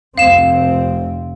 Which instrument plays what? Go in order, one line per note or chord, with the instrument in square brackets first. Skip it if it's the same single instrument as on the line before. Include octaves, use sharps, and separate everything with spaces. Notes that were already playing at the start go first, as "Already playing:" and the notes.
[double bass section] F1 C4 [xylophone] F5 E7